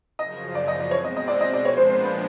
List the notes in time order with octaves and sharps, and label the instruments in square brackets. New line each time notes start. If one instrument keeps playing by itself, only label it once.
[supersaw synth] F#2 C#3 F3 [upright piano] D#5
[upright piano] D5
D#5
D5
[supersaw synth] B2 G#3 C4 [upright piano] C#5
[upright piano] D#5
D#5
D5
D#5
D5
[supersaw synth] A#2 F3 G#3 B3 D4 [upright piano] C#5
[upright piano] C5
C5
B4